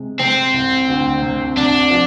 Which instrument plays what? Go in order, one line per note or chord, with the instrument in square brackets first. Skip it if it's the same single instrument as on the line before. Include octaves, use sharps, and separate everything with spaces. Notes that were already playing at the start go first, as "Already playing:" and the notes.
Already playing: [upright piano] C3 G#3
[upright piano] C3 [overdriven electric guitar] C4
[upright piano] C2
D2
C3
[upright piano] C3 [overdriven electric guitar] D4
[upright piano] F3